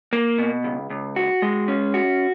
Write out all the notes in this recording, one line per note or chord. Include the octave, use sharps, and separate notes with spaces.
A#3
B2
C#2
C#2
F#4
G#3
C#4
F#4